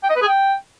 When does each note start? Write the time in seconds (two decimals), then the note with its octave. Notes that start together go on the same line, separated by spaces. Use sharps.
0.03 G5
0.09 D#5
0.16 B4
0.22 G#4
0.28 G5